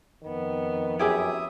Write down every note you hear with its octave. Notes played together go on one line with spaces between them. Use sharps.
F2 D#3 B3
F#2 E4 G4 G#4 E5 D#6